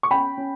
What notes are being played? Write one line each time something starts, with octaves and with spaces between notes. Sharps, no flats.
C#6
C#4 G5 B5
C#4